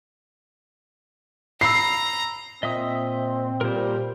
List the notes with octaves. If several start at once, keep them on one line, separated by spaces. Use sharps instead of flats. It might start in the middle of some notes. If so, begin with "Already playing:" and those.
A#5 B5 E6 C7
A#2 C4 D#5 E5 D#6
A#2 G3 A#4 C5